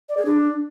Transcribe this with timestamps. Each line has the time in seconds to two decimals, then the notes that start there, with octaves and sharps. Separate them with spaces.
0.09 D5
0.17 G#4
0.25 D4